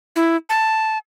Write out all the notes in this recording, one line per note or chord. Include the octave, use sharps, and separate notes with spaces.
E4
A5